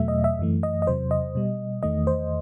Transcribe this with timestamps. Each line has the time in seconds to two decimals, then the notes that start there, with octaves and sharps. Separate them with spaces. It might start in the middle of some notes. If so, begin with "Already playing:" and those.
Already playing: E2 B2 F#3 A3 E5
0.08 D#5
0.24 E5
0.39 F#2 E3 A3
0.63 D#5
0.82 D#5
0.87 E2 C3 F#3 C5
1.11 D#5
1.35 B2 G3
1.83 E2 D#3 A3 D#5
2.07 C5